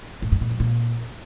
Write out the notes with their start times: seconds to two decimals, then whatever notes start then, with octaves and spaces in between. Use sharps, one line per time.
0.22 A2
0.32 G2
0.41 A#2
0.51 F2
0.60 A#2